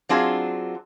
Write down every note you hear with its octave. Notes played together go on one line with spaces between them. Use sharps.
F#3 C4 D4 F4 G#4